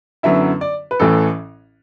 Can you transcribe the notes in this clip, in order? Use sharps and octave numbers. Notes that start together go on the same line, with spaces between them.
F#2 D3 F#3 B3 E4 E5
D5
B4
A1 A2 E3 A4